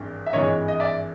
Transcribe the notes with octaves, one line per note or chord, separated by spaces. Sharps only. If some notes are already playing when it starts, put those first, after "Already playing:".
Already playing: G#1 G2 E3 G#3
E5
G#1 G2 E3 G#3 C#5 D#5
D#5
D5 E5